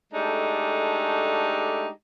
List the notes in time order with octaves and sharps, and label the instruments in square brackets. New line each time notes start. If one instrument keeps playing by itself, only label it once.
[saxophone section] G#3 A3 D4 D#4 G4 A4